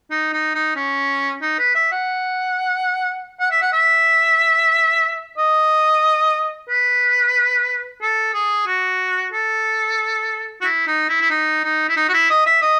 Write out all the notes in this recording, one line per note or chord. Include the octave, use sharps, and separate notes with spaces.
D#4
D#4
D#4
C#4
D#4
B4
E5
F#5
F#5
E5
F#5
E5
D#5
B4
A4
G#4
F#4
A4
F#4
E4
D#4
E4
E4
D#4
D#4
E4
D#4
F#4
E4
D#5
E5
D#5